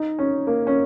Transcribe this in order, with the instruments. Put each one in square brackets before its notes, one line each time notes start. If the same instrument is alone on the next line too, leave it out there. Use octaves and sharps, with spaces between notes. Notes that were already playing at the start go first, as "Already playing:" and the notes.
Already playing: [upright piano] D#4
C#4
A#3
C#4